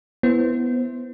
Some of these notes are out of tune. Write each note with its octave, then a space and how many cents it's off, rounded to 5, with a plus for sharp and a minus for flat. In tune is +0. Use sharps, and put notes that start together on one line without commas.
B3 +0 E4 +0 C5 +5